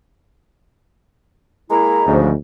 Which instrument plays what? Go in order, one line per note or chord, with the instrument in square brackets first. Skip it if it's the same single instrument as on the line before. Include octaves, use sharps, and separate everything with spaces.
[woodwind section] G#3 A#3 E4 [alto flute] A#5
[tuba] D2 [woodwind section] G#2 C#3 F3